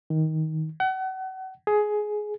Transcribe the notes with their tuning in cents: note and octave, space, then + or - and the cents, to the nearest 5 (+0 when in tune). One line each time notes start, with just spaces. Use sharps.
D#3 +20
F#5 +35
G#4 +15